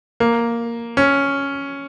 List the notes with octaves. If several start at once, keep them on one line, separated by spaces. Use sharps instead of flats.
A#3
C#4